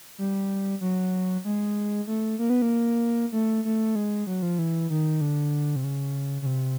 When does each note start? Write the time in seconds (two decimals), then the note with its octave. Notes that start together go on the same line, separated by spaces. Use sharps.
0.18 G3
0.81 F#3
1.45 G#3
2.07 A3
2.39 A#3
2.50 B3
2.62 A#3
3.32 A3
3.65 A3
3.95 G#3
4.27 F#3
4.42 F3
4.59 E3
4.90 D#3
5.21 D3
5.76 C3
5.84 C#3
6.42 C#3
6.46 C3